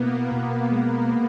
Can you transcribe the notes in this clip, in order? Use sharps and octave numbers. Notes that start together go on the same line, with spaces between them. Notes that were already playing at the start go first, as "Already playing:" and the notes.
Already playing: B2 A#3 B3 E4
B2 B3
G#3
B3